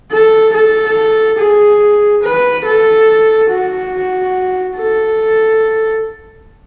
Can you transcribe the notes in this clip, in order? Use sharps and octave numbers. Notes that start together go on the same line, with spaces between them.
A4
A4
G#4
B4
A4
F#4
A4